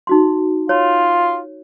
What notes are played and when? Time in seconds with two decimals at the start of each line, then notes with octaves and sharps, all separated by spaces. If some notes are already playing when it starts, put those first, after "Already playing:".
0.07 D#4 F#4 C6
0.69 F4 C#5